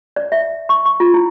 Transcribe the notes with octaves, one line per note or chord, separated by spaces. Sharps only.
D5
E5
C#6
C#6
F4
E4